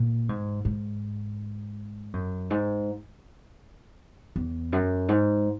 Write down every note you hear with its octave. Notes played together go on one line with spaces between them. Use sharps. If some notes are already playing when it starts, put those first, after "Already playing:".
Already playing: A#2
G#2
G#2
F#2
G#2
E2
F#2
G#2